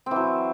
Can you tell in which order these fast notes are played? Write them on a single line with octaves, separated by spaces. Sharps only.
C4 E3 F#3